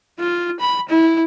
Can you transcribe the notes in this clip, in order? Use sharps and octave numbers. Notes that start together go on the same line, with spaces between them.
F4
B5
E4